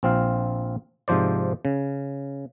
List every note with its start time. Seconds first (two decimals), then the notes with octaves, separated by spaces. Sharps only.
0.03 A#1 C4 F4 F5
1.08 G#2 C3 F3 C5 D5
1.65 C#3